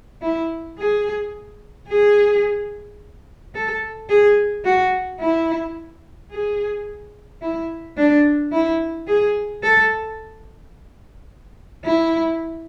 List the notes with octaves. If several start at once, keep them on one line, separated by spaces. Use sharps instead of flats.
E4
G#4
G#4
A4
G#4
F#4
E4
G#4
E4
D4
E4
G#4
A4
E4